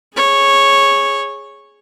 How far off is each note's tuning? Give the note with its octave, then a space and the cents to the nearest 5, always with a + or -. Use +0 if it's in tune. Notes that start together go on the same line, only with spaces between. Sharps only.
G#4 +0 C#5 -10